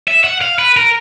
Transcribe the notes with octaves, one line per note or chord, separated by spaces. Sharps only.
E5
F#5
F5
B4
A#4